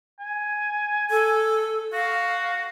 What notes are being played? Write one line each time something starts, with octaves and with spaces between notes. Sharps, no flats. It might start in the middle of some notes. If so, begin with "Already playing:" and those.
G#5
A4
F#4 F5